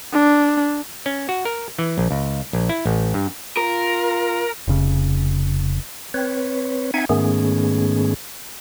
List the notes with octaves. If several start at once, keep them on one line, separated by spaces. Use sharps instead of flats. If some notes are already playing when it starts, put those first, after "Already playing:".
D4
C#4
F#4
A#4
E3
A#1
C#2
A#1
E4
A1
G2
F4 A#4
F1 C#3
C4 B4 C#5
C4 D#4 E5 F#5 G#5 G#6
G#2 D#3 A3 B3 C#4 G#4